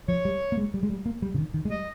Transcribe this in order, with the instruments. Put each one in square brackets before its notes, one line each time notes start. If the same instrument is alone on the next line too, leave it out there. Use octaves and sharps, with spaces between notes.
[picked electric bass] F3 [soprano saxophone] C#5
[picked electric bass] G3
A#3
G#3
G3
G#3
G3
A#3
G3
C#3
D#3
D#3
G#3
[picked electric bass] G3 [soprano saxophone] D#5